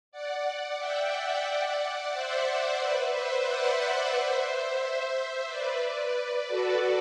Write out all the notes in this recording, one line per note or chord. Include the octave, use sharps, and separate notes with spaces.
D5 F#5
E5 G5
D5 F#5
C5 E5
B4 D5
C5 E5
D5 F#5
C5 E5
B4 D5
B4 D5
F#4 A4